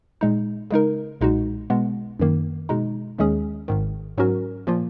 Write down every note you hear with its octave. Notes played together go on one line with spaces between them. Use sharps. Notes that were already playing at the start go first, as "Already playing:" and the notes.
A#2 G#3 D#4
C#3 G#3 D#4 A#4
B1 A#2 G#3 D#4 F#4
B2 G#3 B3
F#2 D#3 A#3
B2 G#3 D#4
D#2 D#3 G#3 C#4 G#4
G#1 G#2 D#3
G#2 F#3 C#4 F#4 A#4
A#2 F3 A#3 F4